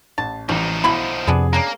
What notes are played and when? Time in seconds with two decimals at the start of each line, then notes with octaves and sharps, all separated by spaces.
0.18 A1 A5
0.49 A1 E3 F3 G3 D#4
0.84 B1 D3 E4 B5
1.27 F2 C3 B3 D4 G#4
1.53 A#3 C#4 D4 A#4